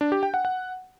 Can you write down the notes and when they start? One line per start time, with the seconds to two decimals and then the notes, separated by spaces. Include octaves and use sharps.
0.01 D4
0.12 G4
0.23 G5
0.34 F#5
0.45 F#5